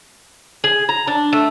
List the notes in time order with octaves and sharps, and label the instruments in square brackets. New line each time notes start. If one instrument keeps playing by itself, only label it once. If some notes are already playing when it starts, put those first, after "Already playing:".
[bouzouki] G#4
A#5
D4
A3